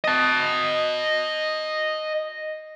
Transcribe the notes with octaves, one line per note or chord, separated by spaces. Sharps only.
D#5 A5